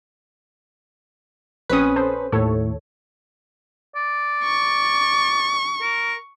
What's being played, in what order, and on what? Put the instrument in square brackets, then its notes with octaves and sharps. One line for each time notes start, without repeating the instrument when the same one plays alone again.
[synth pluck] A#1 C4 D#6 [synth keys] C#4 B4
[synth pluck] A4 C5
[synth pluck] D#2 A4 C#5 [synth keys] A2
[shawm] D5
[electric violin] C#6
[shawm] A#4